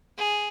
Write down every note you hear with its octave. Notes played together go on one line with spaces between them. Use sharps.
G#4